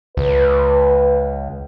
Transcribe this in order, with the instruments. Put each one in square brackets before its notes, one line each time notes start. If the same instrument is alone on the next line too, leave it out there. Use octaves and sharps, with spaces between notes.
[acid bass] C#2 [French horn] B4